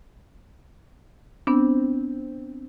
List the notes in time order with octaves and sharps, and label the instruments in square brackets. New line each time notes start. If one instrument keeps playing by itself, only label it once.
[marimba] B3 D4 [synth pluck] C4